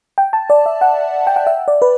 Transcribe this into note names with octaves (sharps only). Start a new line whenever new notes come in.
G5
A5
D5
E5
F#5
G5
F#5
E5
D5
B4